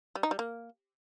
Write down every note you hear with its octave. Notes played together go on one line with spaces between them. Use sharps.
G3
D#4
G3
A#3